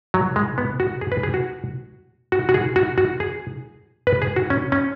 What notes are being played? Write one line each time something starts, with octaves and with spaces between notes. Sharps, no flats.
F#3
G#3
B3
F#4
G#4
B4
G#4
F#4
F#4
F#4
G#4
F#4
F#4
G#4
B4
G#4
F#4
C#4
C#4